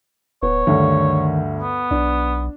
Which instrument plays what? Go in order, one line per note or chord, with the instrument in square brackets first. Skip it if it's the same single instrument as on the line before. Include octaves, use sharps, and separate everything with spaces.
[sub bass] D1 [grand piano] B3 [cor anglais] C#5
[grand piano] D2 G2 [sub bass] D#3
[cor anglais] B3
[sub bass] B1 [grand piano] D4